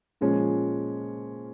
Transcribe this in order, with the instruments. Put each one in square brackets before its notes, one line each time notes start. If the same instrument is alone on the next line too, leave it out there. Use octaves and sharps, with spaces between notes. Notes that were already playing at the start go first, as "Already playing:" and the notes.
[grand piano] A#2 F3 G#3 C#4